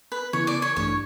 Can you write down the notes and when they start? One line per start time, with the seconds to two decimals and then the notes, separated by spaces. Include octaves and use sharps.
0.12 B4
0.33 C#3 E3 B3 E4 C#5
0.47 D5
0.62 C#5
0.76 A1 G2 E3 A3 D4 C#5